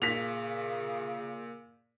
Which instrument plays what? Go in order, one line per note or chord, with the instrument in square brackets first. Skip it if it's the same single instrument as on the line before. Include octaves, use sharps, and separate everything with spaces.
[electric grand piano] A#2 [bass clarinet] C#3 [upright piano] B6 F7